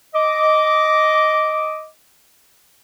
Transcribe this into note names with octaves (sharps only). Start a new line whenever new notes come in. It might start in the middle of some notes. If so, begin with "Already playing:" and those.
D#5 D6